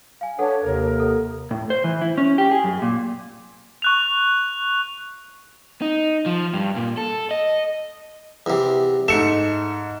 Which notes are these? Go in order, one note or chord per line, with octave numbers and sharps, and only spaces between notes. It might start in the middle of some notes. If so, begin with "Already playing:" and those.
F5 G#5
D4 A4 B4 C#5 F#5
D#2 C3 A#4
A4
A2
C5
E3
E4
C#4
G4
G#4
F#2
A#2
C#6 F#6 F7
D#4
F3
G2
A#2
A4
D#5
E2 C3
G#2 A3 C#7 E7